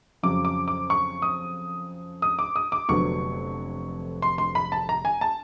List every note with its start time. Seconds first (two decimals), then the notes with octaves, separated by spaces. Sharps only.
0.23 F2 C#3 F#3 D6
0.45 D6
0.68 D6
0.90 C#6
1.22 D#6
2.22 D#6
2.39 D6
2.56 D#6
2.72 D6
2.89 F1 F2 D3 F#3 B3 C#6
4.22 C6
4.38 C6
4.55 B5
4.72 A5
4.89 A#5
5.05 G#5
5.21 A5